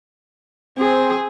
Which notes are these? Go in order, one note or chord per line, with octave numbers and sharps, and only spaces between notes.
C4 G#4